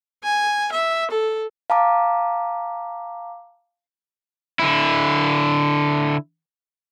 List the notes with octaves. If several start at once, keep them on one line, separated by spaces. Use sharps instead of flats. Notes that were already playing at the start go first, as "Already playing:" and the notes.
G#5
E5
A4
F5 A5 A#5 D6
D3 E4